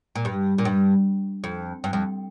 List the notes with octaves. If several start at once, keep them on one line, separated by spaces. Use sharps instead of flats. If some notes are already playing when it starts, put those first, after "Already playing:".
A#2
G2
A#2
G2
F2
G2
F2